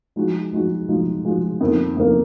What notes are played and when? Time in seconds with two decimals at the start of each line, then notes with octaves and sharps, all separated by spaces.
0.16 F3 G#3 D#4 F#4
0.52 F3 G#3 D#4 F#4
0.88 F3 G#3 D#4 F#4
1.25 F3 G#3 D#4 F#4
1.60 F2 D#3 A#3
1.97 F2 D#3 A#3